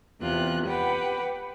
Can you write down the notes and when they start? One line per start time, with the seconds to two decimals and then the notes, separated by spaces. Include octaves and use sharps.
0.20 E2 C3 F4 F#6
0.66 G4 B4 F#5 G5